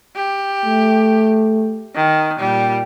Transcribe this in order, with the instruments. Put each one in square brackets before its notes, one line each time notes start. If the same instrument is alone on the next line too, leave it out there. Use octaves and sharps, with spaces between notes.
[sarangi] G4
[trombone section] A3
[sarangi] D#3
[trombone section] A#2 [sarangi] G3